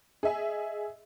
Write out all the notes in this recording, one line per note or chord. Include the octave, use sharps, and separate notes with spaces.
G#4 D#5 E5 G#5